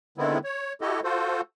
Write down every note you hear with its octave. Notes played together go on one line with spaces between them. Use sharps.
D3 D#3 G#3 B3 C4 E4
C#5
E4 F#4 G4 A4 D#5
F4 F#4 A4 C5